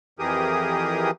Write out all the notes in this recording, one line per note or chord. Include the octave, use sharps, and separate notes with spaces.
F2 E3 G4 G#4 A#4 D#6